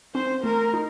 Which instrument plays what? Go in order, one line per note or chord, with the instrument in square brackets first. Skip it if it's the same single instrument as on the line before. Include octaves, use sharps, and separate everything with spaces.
[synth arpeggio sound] C4 [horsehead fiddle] C5
[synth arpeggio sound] A3 [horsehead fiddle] A#4
[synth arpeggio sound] D#4